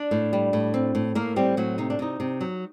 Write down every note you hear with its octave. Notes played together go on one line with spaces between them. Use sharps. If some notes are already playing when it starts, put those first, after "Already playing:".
Already playing: D4 D5
A2
G3
A2
C4
A2
A2 A#3 A#4
G3 C4 G4
A2 F#3 F#4
C3 D#4
D4
C3 D#4
C3
F#3